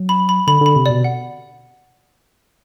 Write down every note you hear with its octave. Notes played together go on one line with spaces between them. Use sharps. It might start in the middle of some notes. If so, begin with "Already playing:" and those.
Already playing: F#3
B5
B5
D3 B5
D3
B5
C3
B2 D5
F#5